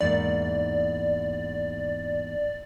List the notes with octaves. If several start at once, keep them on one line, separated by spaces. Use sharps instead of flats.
E2 G#2 A#3 D5